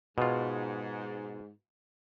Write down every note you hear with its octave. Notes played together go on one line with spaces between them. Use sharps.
G#2 B2 F4